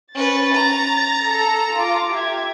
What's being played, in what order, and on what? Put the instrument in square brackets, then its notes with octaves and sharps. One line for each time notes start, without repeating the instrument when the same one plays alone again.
[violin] C#4 B4 [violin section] A6
[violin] A#5
[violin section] A4
F4 D6
G4 E5 G#6